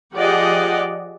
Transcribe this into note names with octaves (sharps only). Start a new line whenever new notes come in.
F3 G4 G#4 D5 D#5 F#5